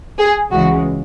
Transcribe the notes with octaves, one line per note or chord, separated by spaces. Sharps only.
G#4
C#2 C#3 E3 G#3 F#4